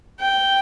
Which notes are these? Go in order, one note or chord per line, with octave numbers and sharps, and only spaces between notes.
G5